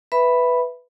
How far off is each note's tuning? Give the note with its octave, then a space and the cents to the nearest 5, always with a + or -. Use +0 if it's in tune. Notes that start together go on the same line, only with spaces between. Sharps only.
B4 +5 E5 +0 B5 +0